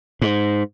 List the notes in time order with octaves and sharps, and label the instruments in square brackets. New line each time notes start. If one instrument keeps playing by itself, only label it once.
[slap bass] G#2